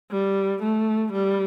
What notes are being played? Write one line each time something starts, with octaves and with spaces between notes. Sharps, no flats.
G3
A3
G3